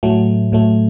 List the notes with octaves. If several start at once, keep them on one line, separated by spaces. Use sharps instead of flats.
A2 F#3 A3
A2 F#3 A3